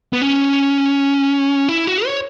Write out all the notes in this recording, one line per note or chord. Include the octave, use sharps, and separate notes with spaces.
B3
C#4
E4
F#4
C#5